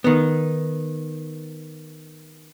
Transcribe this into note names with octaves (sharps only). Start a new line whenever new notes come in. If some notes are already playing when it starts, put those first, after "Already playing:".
D#3 B3